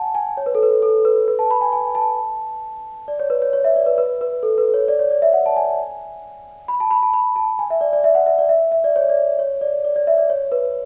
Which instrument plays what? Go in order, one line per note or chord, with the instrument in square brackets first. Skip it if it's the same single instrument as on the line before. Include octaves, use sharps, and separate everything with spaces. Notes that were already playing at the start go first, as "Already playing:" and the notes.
Already playing: [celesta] F#5 G#5 A5
G#5
C#5
B4
A4
B4
A4
B4
B4
A5
B5
G#5
G#5
A5
D5
C#5
B4
C#5
C#5
E5
D5
B4
B4
B4
A4
B4
C#5
D5
C#5
D5
E5
F#5
A5
G#5
B5
A5
B5
A5
B5
A5
G#5
E5
D5
D5
E5
F#5
E5
D5
E5
E5
D5
C#5
D5
C#5
D5
D5
D5
E5
D5
C#5
B4